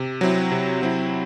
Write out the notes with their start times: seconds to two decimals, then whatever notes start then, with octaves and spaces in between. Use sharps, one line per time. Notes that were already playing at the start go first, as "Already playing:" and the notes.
Already playing: C3
0.21 F#3 C4 E4
0.51 C3
0.82 F#3 C4 E4